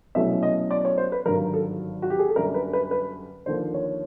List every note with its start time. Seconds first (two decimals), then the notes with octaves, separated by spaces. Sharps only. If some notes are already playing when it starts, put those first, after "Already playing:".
0.15 C2 B2 F#3 A3 C#4 E5
0.43 D#5
0.71 D5
0.85 C#5
0.98 C5
1.12 B4
1.25 G#1 G2 D3 F#3 A#4
1.54 A4
2.02 F#4
2.10 G4
2.19 G#4
2.28 A4
2.36 F#2 D3 G3 A#3 A#4
2.54 B4
2.73 B4
2.91 B4
3.46 D#2 D3 F3 C5
3.74 C#5